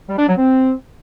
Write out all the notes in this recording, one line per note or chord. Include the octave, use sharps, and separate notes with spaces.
G3
D4
F#3
C4